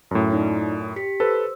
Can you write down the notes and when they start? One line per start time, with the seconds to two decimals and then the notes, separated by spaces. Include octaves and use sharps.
0.11 F#2 A2 C#4
0.32 D#4 F4 D5
0.96 G4 B6 C#7
1.20 A4 B4 C5 E6